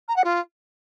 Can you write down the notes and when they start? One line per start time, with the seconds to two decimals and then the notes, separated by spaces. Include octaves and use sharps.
0.08 A#5
0.16 F#5
0.24 F4